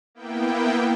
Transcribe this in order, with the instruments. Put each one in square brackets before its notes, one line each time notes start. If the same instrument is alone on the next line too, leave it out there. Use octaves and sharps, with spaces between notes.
[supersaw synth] A#3 B3 E4 G5